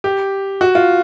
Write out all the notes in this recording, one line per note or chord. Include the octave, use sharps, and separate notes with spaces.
G4
F#4
F4